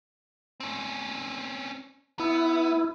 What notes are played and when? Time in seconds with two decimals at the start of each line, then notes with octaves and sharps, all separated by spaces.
0.60 C4 C#4
2.19 B3 E4